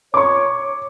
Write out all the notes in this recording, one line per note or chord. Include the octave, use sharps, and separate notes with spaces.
C#5 C#6 D6